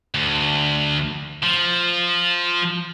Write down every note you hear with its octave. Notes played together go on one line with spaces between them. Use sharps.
D2
F3